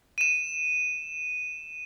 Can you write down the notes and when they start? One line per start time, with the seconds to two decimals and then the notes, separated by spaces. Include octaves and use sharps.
0.18 D#7 E7